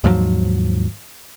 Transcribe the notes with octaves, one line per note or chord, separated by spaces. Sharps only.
D#2 G#2 F3 F#3